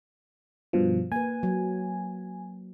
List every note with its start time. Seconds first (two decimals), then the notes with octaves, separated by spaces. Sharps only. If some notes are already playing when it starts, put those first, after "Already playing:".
0.73 G2 B2 F3
1.12 A#3 B4 G#5
1.43 F#3